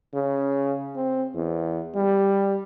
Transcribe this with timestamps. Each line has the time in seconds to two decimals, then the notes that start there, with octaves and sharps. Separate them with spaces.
0.14 C#3
0.96 C4
1.34 E2
1.95 G3